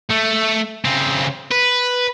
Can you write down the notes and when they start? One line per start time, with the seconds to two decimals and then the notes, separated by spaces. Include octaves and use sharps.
0.10 A3
0.85 C#3 C4
1.51 B4